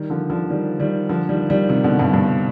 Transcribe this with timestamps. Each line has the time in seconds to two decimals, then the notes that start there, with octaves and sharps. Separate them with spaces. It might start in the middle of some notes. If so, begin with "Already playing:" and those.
Already playing: D#3 G3
0.10 D3 F3
0.30 D3 F3
0.50 D#3 G3
0.80 D#3 G3
1.09 D3 F3
1.29 D#3 G3
1.50 D#3 G3
1.69 C3 D#3
1.84 B2 D3
1.99 G2 B2
2.14 G2 B2